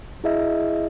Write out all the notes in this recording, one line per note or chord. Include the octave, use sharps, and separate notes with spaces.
E4 G#4 D#5 E5